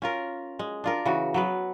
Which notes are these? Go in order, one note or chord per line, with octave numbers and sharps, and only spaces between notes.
C#4 F4 A#4
G#3
D4 F4 A#4
C#3 E3 F#4
F#3 B3 B4